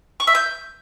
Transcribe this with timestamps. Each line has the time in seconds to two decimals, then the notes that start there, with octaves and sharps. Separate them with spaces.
0.20 C#6
0.27 E5
0.35 G6